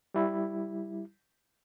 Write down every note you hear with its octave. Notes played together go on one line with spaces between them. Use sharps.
G3 E4